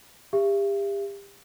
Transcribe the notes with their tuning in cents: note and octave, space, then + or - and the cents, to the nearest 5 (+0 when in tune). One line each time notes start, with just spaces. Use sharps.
G4 +35 E5 +40